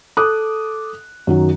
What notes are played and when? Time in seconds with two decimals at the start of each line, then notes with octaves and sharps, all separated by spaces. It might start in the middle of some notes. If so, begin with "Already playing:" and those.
0.17 A4 D6 D#6 F#6
1.27 F#2 D#3 F#3